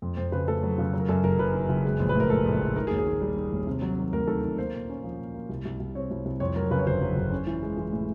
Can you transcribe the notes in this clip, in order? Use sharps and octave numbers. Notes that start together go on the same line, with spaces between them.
F2
F2 C5
C#3 B4
A3 A4
F#3
C#3
F#3
A#4
F#2 A4
F#1 A#4
F#1 B4
D#3
F#1
G#3
A#1
B4
A2 A#4
G#3 A4
A#1
A#1
D#3 A#4
G#4
D#2
G#4
D#3
G3
D#3
D#2
C3
F#3
D#3
D2 A#4
D#3 A4
D#3
A#3 C5
A#2
C#4
F3
A#2
A#3
C2
C2
C2
C4 C#5
C2
C2
F2 C#5
F#3 A#4
C#3 B4
C#5
G1 C5
F#3
G1
C#4
E3
G#3
E3
A2